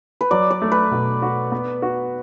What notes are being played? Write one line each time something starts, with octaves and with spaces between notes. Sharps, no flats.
B4
F#3 D5
D5
A3
B4
B2
F#4
B3
F#4